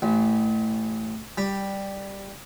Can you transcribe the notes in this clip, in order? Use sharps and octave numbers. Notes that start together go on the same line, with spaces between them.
A1
G3